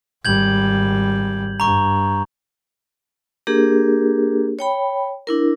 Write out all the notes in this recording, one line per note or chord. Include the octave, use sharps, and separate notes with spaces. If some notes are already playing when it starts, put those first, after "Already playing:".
G#1 G3 G6 G#6 F#7
G2 A#5 C#6
A#3 D4 G4 G#4 A#4
C#5 G5 B5
D4 E4 A#4